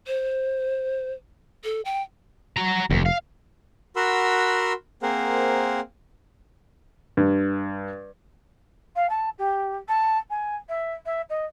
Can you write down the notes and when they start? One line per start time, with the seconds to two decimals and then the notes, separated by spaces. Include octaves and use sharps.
0.07 C5
1.64 A4
1.85 G5
2.57 F#4 A#5
2.91 F1 D#2
3.06 F5
3.96 F#4 A#4 F#5 B5 C6 E6
5.03 A#3 C4 G#4 A#4 C5 F#5
7.17 G2
8.95 F5
9.09 A5
9.38 G4
9.88 A5
10.30 G#5
10.68 E5
11.05 E5
11.29 D#5